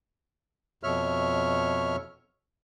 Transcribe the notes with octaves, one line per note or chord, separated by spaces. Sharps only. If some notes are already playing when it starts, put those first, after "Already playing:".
F2 B2 C#5 E5 F6